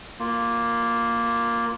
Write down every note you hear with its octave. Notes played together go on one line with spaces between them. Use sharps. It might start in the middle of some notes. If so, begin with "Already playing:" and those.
A#3 F4